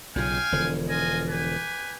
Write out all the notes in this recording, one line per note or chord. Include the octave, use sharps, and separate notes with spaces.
B1 A#2 C#3 F5 G5 G#5
E1 D3 F3
F4 D#5 G#5
G4 B4 G#5